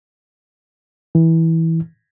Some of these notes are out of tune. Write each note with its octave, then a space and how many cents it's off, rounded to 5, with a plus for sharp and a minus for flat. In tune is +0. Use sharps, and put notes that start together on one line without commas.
E3 -15